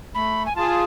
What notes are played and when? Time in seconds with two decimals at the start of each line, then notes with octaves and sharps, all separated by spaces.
0.15 A3 B5
0.46 G#5
0.56 F4 G#4 A5